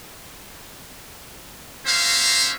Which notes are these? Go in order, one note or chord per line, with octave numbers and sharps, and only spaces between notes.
A#3 C#4 F#4 C5 E5 F5